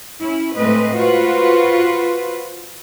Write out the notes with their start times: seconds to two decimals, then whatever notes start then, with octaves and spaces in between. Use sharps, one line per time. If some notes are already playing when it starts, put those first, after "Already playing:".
0.21 C#4 E4
0.55 A2 G#3 A3 C4 B4 D#5
0.97 F4 F#4 B4 C5